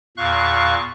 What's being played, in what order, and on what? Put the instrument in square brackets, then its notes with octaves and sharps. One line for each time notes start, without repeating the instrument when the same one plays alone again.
[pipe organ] E2 A#2 F5 C#6 F#6